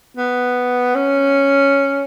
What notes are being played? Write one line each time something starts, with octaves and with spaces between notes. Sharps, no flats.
B3
C#4